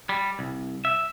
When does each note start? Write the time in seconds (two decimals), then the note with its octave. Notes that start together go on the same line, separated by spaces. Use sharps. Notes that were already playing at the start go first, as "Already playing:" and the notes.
0.09 G3
0.39 C2
0.85 E5